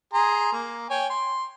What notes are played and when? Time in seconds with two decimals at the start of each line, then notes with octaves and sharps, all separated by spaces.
0.14 G#4 A#5 C6
0.52 A#3
0.90 C#5 G5 G#5
1.10 C6